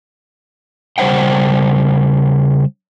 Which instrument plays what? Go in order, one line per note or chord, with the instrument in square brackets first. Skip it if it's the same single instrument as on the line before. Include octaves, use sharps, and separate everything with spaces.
[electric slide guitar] C#3 G3 D#4 C5 F#5 G5